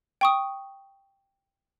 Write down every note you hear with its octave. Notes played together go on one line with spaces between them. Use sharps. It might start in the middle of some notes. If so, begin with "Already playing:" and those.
G5 C#6 D#6